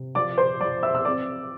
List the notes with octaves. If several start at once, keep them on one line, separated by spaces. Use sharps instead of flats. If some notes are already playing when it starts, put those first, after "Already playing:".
Already playing: C3
F3 D5 D6
C5 C6
F3 D5 D6
E5 E6
E6
C4 D5 D6